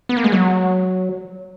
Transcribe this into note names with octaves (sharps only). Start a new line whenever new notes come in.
B3
A#3
G#3
F#3